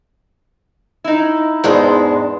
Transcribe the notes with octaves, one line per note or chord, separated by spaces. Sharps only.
D#4 E4
E2 G#2 G#3 D4